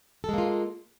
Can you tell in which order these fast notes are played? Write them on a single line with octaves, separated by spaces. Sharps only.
A4 G#3 A#3 F4